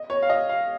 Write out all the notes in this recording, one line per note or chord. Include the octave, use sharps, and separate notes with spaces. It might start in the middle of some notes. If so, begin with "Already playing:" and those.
Already playing: D#5
C#5
F5
D#5
F5